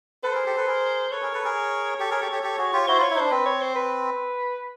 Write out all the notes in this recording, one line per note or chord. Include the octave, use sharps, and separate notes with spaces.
A4 B4 C5
G#4 A#4
G4 A4
A4 B4
G#4 A#4
A4 B4 C#5
G#4 A#4
A4 B4
G#4 A#4
G4 A4
G#4 A#4
G4 A4
G4 A4
G4 A4
F#4 G#4
F4 G4
E4 F#4 C5
F4 C#5
E4
D4 D#4 C5
C4 B4
C#5
C5
B4